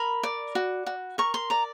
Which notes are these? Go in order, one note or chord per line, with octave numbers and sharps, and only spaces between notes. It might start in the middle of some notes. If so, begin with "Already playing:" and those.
Already playing: A#4 B5
D5
F#4
F#4
A#4 C#6
C6
D5 A#5